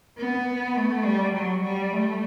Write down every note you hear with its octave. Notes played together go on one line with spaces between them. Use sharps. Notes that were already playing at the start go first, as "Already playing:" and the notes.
B3
A3
G3
F#3
G3
A3